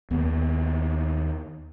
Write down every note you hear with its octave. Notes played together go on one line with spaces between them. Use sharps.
D#2 B3